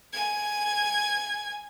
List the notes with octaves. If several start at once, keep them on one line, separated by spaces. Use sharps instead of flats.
G#5 G#6